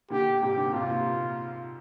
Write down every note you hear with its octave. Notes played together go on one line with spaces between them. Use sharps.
A#2 D3 G4
G#2 C3 G4
A#2 D3
G#2 C3 F4
A#2
A#2